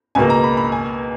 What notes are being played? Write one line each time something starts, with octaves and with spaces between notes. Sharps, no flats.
C#2 B2 A#3 G#5
A#5
B5
B5
G#5